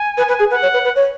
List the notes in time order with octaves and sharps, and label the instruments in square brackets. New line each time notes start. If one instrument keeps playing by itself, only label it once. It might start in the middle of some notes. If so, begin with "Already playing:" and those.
Already playing: [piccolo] G#5
[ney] B4
B4
G#4
[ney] B4 [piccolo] F#5
[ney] C#5
B4
B4
C#5